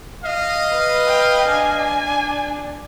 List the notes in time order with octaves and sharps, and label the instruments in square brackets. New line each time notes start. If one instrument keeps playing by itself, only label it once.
[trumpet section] D#5 F5
[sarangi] B4
[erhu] G5
[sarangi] D4 [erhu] G#5